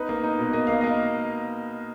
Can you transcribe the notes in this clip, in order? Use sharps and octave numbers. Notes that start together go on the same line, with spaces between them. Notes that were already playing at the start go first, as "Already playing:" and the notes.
Already playing: B3 D#4 B4
A#3
D#4
B2
A#3 D#5
A#3 F5
A#3 D#5